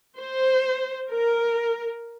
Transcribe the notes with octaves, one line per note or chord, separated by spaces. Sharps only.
C5
A#4